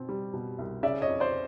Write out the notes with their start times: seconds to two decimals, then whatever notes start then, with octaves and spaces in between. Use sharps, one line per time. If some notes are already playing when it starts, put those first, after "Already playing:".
Already playing: B2 C4
0.09 G3
0.34 B2
0.59 C2
0.83 C#3 D5 E5
1.01 C#5 D#5
1.08 F2
1.20 C5 D5